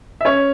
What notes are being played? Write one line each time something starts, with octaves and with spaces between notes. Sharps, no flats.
E5
C#4 C#5